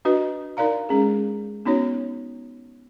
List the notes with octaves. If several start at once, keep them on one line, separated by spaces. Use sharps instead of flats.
D4 F#4 B4 D#5
D#4 A#4 D5 F5 A#5
G#3 C#4 G#4
B3 C#4 D#4 F#4 C#5